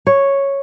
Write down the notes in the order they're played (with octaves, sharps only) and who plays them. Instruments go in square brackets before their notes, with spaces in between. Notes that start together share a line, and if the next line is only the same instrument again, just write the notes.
[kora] C#5